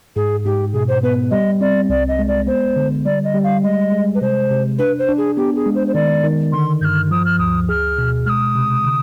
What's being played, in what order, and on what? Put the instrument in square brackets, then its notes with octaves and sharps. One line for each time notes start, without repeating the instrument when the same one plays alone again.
[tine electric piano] G#2 [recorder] G#4
[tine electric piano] G#2 [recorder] G4
[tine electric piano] B2 [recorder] G#4
[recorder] C5
[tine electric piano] B3 [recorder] B4
[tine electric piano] G3 [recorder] D#5
[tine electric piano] C4 [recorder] D5
[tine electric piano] C2 [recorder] D5
[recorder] D#5
[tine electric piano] G#3
[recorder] D5
[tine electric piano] B3 [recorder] C5
[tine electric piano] D3
[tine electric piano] G3 [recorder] D5
[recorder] D#5
[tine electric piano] G3
[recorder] F5
[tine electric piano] G#3 [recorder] D#5
[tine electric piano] G#3
[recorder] B4
[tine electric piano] C3 [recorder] C5
[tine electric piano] C3
[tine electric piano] D4 [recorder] B4
[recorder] C5
[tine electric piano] D4
[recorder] G#4
[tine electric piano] B3 [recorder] G4
[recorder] G#4
[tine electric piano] G#3
[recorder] C5
C5
[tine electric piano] D#3 [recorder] D5
[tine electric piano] D#3
[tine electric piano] D3 [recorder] C6
[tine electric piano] G2 [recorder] F6 G6
[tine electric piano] F3 [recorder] D#6
[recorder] F6
[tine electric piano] D2 [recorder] D#6
[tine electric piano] G#4 [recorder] F6
[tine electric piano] B2
[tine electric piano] G#3 [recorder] F6
[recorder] D#6
[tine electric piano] C3
D3